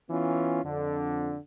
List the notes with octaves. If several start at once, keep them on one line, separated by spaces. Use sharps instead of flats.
E3 B3 C#4 F4
F2 D3